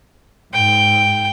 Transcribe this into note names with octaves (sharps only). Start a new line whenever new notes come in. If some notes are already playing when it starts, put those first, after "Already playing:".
G#2 G5